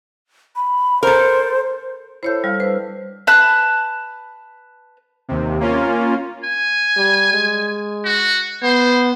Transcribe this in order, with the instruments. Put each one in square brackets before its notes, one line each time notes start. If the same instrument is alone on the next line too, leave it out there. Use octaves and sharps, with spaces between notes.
[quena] B5
[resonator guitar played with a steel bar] A4 A#4 [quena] C5
[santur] E4 A4 [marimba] C5 C#5 G6
[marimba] G3 [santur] F5
[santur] D4 [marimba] B4 C5
[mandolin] B4 A5 F#6
[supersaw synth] D#2 C3
A#3 C#4 F4
[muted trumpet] G#5
[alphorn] G3
G#3
[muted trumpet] F#4
[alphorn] B3 [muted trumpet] C5